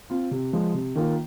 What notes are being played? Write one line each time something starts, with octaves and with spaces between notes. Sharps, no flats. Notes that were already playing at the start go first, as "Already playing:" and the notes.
C4 F4
C3
F3 G#3
C3
D#3 A#3 F4